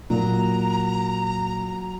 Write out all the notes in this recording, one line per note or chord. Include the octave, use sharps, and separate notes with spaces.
A#2 F#3 A#5